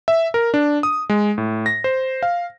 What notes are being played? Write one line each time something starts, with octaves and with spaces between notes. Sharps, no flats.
E5
A#4
D4
D#6
G#3
A2
A#6
C5
F5